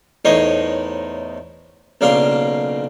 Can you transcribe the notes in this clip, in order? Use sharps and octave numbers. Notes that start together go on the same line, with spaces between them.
E2 A2 D#4 C5 C#5 D#5
B1 C#3 A#3 D4 F5 C6